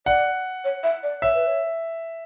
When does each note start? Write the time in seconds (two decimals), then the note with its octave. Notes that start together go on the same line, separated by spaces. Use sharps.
0.06 D5 F#5
0.64 C#5
0.83 E5
1.03 D5
1.22 C#5 E5
1.35 B4
1.47 C#5